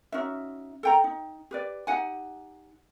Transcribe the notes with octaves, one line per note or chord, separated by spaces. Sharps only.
C#4 D#4 F#4 E5
A4 G5 A#5
D#4
G4 B4 D5
D#4 G4 F#5 G#5